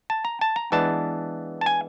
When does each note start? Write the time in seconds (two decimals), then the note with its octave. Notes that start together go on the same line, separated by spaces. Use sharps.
0.10 A5
0.25 A#5
0.41 A5
0.56 A#5
0.72 E3 G#3 B3 D4 A5
1.61 A5
1.66 G#5